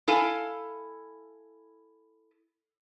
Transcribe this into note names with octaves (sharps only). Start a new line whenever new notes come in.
E4 A4 F5 G#5